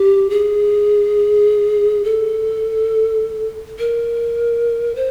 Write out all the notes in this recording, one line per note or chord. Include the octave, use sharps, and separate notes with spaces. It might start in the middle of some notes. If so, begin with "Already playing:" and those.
Already playing: G4
G#4
A4
A#4
C5